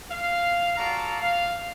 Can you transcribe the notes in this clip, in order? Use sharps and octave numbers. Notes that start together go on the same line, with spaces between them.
F5
F4 F#4 A4 D5 F5 A#5
F5